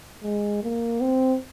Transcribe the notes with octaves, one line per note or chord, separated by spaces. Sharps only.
G#3
A#3
C4